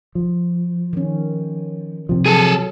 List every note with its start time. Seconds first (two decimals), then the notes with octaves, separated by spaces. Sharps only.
0.15 F3
0.93 D#3 C#4
2.09 C3 F3
2.26 F#3 G#4 A4